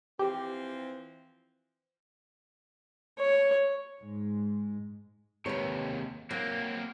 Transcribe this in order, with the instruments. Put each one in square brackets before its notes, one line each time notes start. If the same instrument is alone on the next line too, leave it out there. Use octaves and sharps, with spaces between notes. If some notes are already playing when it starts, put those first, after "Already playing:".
[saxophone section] E3 F3 C4 [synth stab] G4
[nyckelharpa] C#5
[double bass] G#2 G#3
[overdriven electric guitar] D#2 C3 [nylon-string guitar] B4 C#5
[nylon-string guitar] F#3 [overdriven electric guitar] A#3 C4